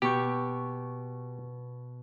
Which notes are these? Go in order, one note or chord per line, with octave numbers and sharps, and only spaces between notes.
B2 G4 C#6 G6